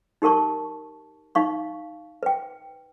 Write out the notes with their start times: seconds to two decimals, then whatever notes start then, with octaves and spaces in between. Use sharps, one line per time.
0.22 D#4 G4 A#4 A5 C#6
1.35 D#4 F5 C#6
2.23 B4 G5